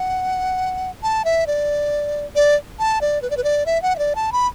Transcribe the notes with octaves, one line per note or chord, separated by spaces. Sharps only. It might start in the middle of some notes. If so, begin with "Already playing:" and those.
Already playing: F#5
A5
E5
D5
D5
A5
D5
B4
D5
B4
D5
E5
F#5
E5
D5
A5
B5